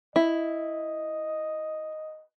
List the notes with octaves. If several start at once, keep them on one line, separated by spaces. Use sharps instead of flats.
E4 D#5